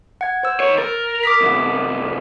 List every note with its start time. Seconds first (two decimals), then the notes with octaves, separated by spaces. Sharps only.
0.21 F#5 G#6
0.43 C5 E6
0.60 D#2 C#5
0.78 A#4 A6
1.23 D6 D#6 B6
1.41 C2 F#2